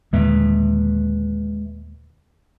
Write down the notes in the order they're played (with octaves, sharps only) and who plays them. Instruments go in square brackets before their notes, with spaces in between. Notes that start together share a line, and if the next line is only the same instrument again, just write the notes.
[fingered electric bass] D#2 A#2 D3 [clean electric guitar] G#3 B4 E5